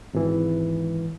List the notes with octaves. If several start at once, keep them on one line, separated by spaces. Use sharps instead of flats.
G#1 E3